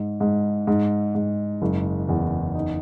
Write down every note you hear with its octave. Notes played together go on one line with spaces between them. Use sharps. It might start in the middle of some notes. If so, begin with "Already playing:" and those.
Already playing: G#2
G#2
G#2
G#2
F#1
E2
D#4